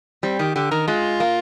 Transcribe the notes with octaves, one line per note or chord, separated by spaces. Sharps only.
G3 C4
D#3 G4
D3 G4
D#3 A#4
G#3 F4
A#3